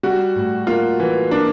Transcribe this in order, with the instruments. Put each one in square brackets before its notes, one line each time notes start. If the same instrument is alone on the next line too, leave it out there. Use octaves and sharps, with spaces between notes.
[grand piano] G3 [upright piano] F#4
[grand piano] A2
[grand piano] A#3 [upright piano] F4
[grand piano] E3
[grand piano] A#3 [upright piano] D4